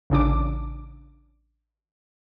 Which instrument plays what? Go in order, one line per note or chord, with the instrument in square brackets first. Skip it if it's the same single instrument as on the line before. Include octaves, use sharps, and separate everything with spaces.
[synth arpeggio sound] A1 C#3 D4 D6